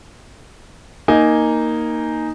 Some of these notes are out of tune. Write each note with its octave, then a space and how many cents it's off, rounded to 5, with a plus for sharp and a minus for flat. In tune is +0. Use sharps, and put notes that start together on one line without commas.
A#3 +0 D#4 +0 G#5 +0